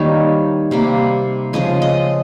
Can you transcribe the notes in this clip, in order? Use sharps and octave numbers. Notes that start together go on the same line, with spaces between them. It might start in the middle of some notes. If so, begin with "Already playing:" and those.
Already playing: D#3 G3 A#3 C#5
C3 G3 A#3
C#3 F3 G#3 D#5
D#5